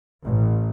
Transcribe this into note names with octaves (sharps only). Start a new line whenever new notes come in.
A1